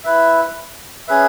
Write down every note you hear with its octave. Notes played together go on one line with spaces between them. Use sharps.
E4 B4 E5
C#4 G#4 B4 E5